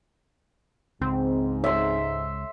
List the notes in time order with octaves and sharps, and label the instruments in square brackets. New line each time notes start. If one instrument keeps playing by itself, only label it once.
[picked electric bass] C#2 [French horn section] G#2 [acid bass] C4
[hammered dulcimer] E5 C6